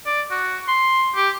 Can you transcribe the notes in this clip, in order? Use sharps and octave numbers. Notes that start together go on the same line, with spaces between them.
D5
F#4
C6
G4